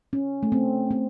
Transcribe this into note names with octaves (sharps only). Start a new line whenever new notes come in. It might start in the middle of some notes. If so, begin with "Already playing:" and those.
C#4
A3
C4
C4